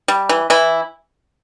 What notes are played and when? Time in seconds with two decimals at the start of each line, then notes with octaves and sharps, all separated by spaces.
0.08 G3
0.29 E3
0.50 E3 E4